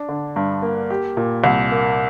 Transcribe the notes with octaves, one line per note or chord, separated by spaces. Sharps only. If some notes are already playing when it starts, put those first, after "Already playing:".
Already playing: D4
D3
G2
A#3
G4
A#2
C2
A#3